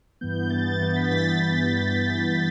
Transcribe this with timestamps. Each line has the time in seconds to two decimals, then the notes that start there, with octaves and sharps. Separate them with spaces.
0.21 G2 E3 B3 G6
0.50 G2 E3 B3 A6
0.80 G2 E3 B3 A6
0.96 B6
1.10 G2 E3 B3 A6